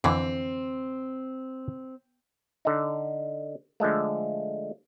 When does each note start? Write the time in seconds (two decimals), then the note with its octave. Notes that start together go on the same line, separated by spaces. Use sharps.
0.04 F2 D3 E3 C4
2.65 D3 D#4
3.80 D3 F3 G#3 A3